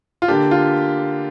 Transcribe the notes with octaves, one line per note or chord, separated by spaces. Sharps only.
F4
D3 A#3 D4 G4
F4